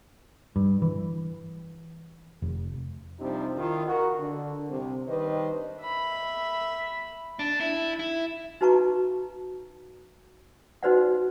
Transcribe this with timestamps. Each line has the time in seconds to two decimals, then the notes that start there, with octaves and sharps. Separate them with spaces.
0.56 G2
0.82 E3
2.42 F1
3.20 C3 F3 G3 C4 D4 D#4
3.57 D#3 E4 F4
3.87 F#4 A#4
4.18 D3
4.69 C2 C3
5.07 D#3 G3 D4 B4 C5 D#5
5.82 E5 B5
7.39 D4
7.60 E4
7.99 E4
8.61 D#4 F#4 B4 A5 A#5 C#6
10.83 D#4 F#4 B4 C5 D5 F#5